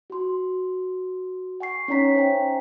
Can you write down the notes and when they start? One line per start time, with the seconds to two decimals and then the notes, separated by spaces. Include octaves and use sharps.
0.10 F#4 C6
1.60 F#5 G#5 C#6 C7
1.88 C#4 D#4 C#5 A#5 B6
2.15 C5 E5 G5 G#5